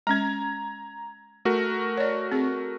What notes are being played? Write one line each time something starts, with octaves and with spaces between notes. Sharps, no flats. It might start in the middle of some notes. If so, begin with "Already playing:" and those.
G#3 C#4 A#5 G#6
A3 F#4 A#4
C#5 D5
C4 G#4